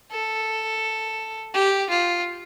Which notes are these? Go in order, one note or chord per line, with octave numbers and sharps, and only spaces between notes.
A4
G4
F4